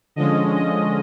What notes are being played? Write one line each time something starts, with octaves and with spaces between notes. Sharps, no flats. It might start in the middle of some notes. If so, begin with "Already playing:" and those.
D3 F3 G#3 C#4 D#5
D#5